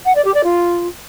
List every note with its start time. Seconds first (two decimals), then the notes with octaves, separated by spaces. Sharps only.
0.05 F#5
0.15 D5
0.24 G4
0.34 D5
0.44 F4